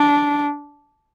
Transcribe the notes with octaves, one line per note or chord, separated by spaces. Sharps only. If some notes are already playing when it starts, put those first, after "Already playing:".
Already playing: D4